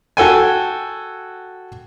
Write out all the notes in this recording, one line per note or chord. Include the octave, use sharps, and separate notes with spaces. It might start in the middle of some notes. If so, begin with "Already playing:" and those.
F#4 A4 G5 G#5